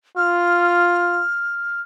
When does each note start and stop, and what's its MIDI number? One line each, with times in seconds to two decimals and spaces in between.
0.17 1.23 65
0.17 1.81 89